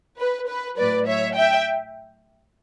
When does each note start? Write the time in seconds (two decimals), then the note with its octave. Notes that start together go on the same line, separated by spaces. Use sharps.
0.19 B4
0.48 B4
0.77 A2 F#3 B4 D5
1.07 C#5 E5
1.35 E5 G5